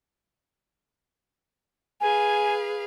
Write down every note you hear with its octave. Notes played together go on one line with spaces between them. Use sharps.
G#4 B4 F5 G#5